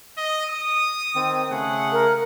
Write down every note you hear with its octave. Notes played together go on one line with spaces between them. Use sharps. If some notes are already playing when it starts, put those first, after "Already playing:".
D#5
D#6
D#3 C4
C#3 A3 G#4 F#5
A#4